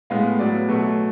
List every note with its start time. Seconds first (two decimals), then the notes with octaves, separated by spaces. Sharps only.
0.10 A2 G#3 B3 F5
0.39 A2 F#3 B3 D5
0.68 B2 F#3 A3